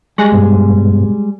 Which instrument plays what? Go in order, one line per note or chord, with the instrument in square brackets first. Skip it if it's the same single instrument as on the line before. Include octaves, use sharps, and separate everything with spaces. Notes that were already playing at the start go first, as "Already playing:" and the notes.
[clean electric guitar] G3 G#3 G#4 [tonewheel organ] C#6 F#6 A#6
[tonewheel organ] G2 B2